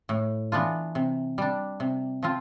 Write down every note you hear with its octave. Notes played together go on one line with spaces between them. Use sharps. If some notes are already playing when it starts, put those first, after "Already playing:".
A2
E3 B3 D4 F4
C3
G3 D4
C3
F3 C4 F4